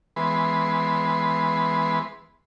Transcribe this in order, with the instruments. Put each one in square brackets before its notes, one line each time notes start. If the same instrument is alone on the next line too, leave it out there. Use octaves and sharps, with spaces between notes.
[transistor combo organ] E3 G#3 B3 B4 C6